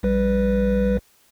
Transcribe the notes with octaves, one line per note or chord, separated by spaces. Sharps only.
A#1 G3 B4